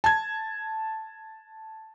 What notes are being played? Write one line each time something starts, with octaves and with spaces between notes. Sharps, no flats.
A5 G#6